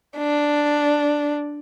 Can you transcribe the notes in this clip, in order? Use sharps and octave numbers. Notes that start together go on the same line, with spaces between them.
D4